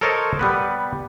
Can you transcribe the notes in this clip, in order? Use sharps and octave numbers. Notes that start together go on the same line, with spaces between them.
A4 A#4 C5 C#5 D#5 A5
G3 B3 B4